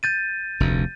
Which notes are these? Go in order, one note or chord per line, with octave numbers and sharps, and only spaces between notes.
G6 A6 D#7
F1 D2